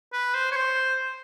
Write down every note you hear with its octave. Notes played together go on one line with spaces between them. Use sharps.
B4
C5
C#5
C5